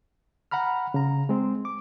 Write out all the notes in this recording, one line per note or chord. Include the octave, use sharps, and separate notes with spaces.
F#5 A#5 B5 F6
C#3 A#5
G#3 C4
D6